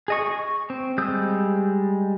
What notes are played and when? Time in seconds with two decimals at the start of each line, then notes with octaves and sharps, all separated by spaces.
0.08 G#4 D#5 C#6
0.27 C#6
0.70 C4
0.98 G3 G#3 D#6 E6 G6